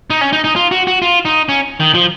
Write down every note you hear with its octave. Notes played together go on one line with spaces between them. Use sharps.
D#4
C#4
D#4
D#4
F4
F#4
F#4
F4
D#4
C#4
D#3
F3